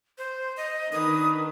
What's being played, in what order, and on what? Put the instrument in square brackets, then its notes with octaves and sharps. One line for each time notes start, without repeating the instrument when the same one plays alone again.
[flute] C5
D#5
[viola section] D#3 D4 B4 [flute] D#6